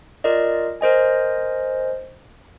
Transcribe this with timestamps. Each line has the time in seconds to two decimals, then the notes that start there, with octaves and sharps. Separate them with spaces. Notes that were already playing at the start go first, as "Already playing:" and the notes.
0.24 F4 A#4 D5 D#5
0.81 A#4 C5 D#5 G#5